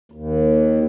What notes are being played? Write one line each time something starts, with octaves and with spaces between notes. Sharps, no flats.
D#2